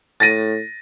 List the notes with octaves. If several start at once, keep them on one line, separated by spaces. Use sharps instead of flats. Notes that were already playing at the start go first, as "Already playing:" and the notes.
A2 A6 A#6 D#7